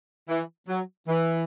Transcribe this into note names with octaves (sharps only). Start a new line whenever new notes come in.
E3
F#3
E3